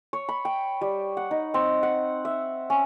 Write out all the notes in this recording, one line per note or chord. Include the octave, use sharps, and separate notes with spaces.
C#5
B5
G5
G3
F#5
D#4
C4
F#5
E5
C#4